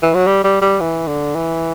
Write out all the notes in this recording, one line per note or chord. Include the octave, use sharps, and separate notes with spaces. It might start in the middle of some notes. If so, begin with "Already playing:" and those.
E3
F#3
G3
G3
G3
E3
D3
E3